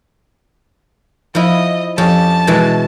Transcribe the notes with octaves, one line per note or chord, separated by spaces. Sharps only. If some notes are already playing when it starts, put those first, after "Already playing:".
F3 E4 D#5
F2 C#4 G4 A5
B2 E3 G#3